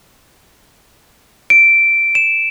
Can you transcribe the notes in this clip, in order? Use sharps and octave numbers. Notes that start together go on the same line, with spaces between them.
D7
E7